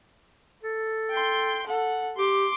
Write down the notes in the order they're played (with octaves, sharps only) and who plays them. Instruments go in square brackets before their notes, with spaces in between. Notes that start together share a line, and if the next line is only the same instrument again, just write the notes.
[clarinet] A4
[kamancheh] G5 C6
A4 F#5
[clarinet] G4 [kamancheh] C6 D6